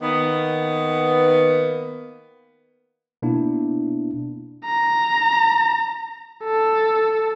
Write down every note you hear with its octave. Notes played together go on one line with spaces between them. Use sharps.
D#3 A#3 B3
B2 A#3 B3 D4 E4
A#5
A4